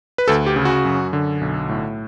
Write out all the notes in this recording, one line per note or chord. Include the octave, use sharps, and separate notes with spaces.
B4
D2 A4
G4
C#3
F#4
F#2
D3
B1
A2